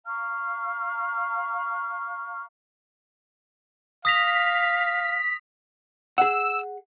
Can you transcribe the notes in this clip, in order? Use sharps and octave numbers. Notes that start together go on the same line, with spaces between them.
F5 A#5 C#6 F6
F5 D#6 A#6 B6 F7
G#4 F#5 E6